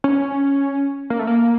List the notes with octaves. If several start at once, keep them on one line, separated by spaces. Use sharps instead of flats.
C#4
A#3
A3
A#3